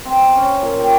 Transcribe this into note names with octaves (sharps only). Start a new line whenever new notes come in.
C4
C#4
A#2
G4